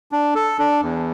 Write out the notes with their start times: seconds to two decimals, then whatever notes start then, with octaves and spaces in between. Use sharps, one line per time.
0.12 D4
0.35 A4
0.59 D4
0.82 E2